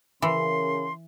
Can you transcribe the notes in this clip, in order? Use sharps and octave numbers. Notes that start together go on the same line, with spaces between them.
C#3 E3 A#4 C6